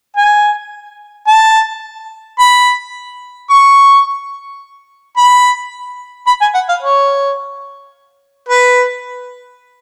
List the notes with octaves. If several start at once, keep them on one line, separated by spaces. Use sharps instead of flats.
G#5
A5
B5
C#6
B5
B5
G#5
F#5
F5
C#5
B4